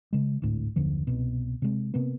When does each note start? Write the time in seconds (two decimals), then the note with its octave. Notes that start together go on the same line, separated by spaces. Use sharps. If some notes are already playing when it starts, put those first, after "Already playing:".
0.13 C#3 G#3
0.42 G#1 D2 A2
0.76 F#1 D#2 D3 F3
1.07 C2 B2
1.62 C3 G#3
1.94 C3 A#3 B3